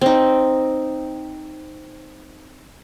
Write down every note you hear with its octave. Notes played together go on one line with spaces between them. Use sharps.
C4 D#4